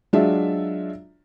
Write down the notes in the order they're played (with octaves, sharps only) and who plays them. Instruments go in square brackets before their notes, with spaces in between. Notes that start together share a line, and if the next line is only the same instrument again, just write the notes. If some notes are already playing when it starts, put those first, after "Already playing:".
[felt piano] F#3 G#3 D4 F4 D5 E5